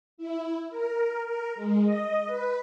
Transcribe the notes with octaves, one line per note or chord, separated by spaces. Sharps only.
E4
A#4
A#4
G#3
D#5
B4